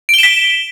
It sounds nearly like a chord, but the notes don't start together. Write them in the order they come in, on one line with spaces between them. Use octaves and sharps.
D7 G7 E7 B6